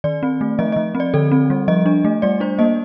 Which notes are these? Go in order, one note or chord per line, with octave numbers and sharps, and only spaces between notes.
D#3 D5
C4
A3
F3 D#5
F3 D#5
C4
D5
D3 A4
C4
G3
F3 D#5
D4
A3
G3 D5
D4 C5
A#3 D#5